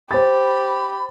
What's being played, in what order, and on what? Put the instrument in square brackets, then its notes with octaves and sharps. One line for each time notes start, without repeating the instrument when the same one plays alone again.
[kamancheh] G4 [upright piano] C5 A6 [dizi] B5